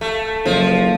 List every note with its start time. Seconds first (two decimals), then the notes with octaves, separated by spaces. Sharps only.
0.01 A3
0.46 F#1 F3